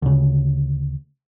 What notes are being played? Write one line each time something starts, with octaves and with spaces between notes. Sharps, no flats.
D2 C#3